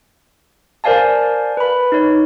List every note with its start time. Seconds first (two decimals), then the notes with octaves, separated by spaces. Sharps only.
0.84 A#4 C5 D5 F5 G#5 A5
1.57 B4 B5
1.92 D#4 C#5